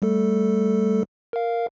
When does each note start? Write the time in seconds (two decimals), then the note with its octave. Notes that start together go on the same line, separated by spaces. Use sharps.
0.02 G3 A3 A4
1.33 A#4 F5